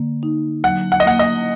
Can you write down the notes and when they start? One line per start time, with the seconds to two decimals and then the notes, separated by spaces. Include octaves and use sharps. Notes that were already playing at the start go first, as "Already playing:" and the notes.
Already playing: D3 A#3
0.23 D#4
0.64 F#3 F#5
0.92 F#5
1.00 D#5
1.06 A#3 F#5
1.19 D#5